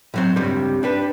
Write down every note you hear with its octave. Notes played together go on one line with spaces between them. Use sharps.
A2 F#3 C4
C#2 G2 C3 G3 G4
D4 G4 B4